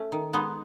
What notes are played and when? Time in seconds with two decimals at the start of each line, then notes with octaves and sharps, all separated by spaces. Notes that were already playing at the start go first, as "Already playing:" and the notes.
Already playing: A3 C#4
0.12 D#3
0.33 G#3 B3 D#4